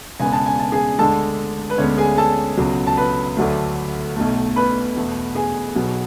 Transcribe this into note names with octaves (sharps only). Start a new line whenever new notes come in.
E1 E2 C#3 G#3 B3 G#5
A5
G#5
A5
G#4 G#5
D2 D3 G#3 A4 A5
B4
D2 D3 G#3 B3 C#4 C#5
G#4 G#5
A4 A5
C#2 B2 F#3
A5
B4 B5
D2 D3 F#3 A3
B1 B2 A3
B4 B5
E2 B2 A3
G#4 G#5
B1 B2 F#3 B3